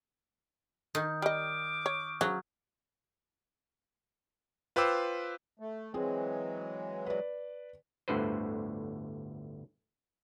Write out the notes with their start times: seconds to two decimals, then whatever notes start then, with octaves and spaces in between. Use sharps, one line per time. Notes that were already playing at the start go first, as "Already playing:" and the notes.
0.95 D#3 D#6 G6
1.22 G3 D#5 D6 F6
1.86 C#5 C#6
2.21 C#3 F#3 C5
4.76 F4 B4 C5 G5 D6 E6
5.59 A3
5.94 E3 F#3 G#3 C4 G#4
7.06 B4 D5
8.08 G1 D2 A2 D3 B4 C5